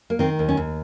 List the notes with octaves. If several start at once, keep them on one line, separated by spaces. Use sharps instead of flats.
A#3
D#3 C4
D#2
C#4
D#2